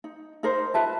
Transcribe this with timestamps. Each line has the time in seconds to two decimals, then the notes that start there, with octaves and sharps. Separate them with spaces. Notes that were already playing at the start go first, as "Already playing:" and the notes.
0.04 D#4
0.43 D#4 A#4 C5
0.74 F4 B4 E5 A5